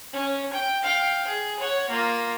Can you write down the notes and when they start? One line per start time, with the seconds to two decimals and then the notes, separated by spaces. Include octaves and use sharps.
0.13 C#4
0.53 G5
0.82 F5 G5
1.27 G#4
1.59 C#5 F#5
1.90 A#3 F4